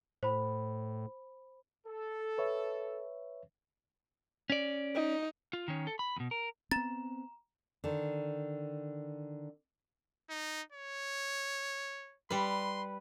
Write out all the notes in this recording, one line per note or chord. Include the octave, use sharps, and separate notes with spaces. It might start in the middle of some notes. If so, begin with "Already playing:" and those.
A2 C5 B5
A4
B4 C#5 E5
C#4 D5
D#4
F4
D#3 C#4
A4
B5
E2 B2
A#4
B3 C4 A#5 A6 E7
D3 D#3
D#4
C#5
G3 B4 C6